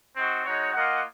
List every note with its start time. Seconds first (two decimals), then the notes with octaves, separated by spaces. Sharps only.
0.15 C4 D#4 F#4
0.45 G#3 D#4 F#4 C#5
0.73 A#3 F4 A#4 D#5 F#5